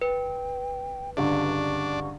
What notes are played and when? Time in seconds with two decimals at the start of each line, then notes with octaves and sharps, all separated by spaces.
0.02 B4 G5
1.17 C#2 G2 D3 D4 C#6